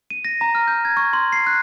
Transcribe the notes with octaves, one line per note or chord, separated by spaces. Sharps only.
D#7
A#6
A#5
F6
G6
G#6
C#6
C6
C7
F#6